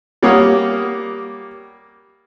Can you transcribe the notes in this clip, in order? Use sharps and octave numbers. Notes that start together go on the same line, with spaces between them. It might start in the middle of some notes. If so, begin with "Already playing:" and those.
G3 A#3 C#5 F5 F#5 D#6